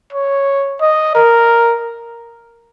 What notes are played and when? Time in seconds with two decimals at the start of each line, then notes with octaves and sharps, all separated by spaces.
0.12 C#5
0.81 D#5
1.15 A#4